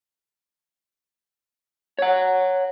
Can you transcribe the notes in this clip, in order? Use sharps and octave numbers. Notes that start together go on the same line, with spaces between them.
C#5 F#5